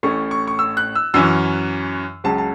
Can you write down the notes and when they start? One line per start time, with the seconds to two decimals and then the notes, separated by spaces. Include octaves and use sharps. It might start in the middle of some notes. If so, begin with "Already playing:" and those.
0.03 A1 A2 A3 C#4 C#6
0.31 C#6
0.47 C#6
0.59 E6
0.77 F#6
0.95 E6
1.14 F#2 E3 C#4 E6
2.24 C#2 C#3 F#3 A5
2.38 A5